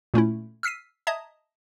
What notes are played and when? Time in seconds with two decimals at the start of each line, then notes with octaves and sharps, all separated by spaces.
0.14 A#2 A3 C#4 E4
0.63 E6 F6 B6 C7 D#7
1.07 D#5 E5 A5 A#5 D#6 G#6